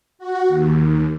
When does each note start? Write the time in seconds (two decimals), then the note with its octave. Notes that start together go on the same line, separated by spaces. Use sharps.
0.19 F#4
0.48 D#2